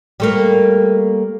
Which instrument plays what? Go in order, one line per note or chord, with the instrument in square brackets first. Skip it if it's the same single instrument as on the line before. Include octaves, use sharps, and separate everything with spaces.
[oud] G3 A3 A#3